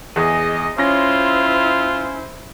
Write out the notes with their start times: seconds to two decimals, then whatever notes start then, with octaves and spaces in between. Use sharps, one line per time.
0.16 E2 G#4 D#5 D#6
0.78 C#4 E4 F4 C5 A#6